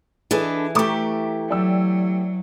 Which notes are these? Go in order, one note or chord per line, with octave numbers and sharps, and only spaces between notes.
E3 D4 G#4 A4 B4 D#5
A3 G4 A#5 C#6 D6
F#3 D5 G5 E6